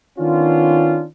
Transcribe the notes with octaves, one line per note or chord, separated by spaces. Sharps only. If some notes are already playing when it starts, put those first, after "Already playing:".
D#3 B3 C#4 D4 F4